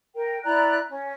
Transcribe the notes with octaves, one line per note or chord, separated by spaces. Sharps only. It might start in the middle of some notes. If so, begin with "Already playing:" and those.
A#4 G5
E4 D5 A#5 F#6
C#4